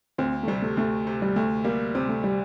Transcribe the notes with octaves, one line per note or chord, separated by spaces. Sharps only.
D2 C4
A3
C3 G3
A3
D2 A3
C3
G3
D2 A3
G3 A#3
C3 C4
A3
G3